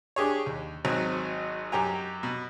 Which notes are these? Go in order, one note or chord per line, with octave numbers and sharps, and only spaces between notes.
D4 G4 G#4 C#5
D#2
G#1 F#3 C4
F#2 G4 G5 G#5 A#5
B2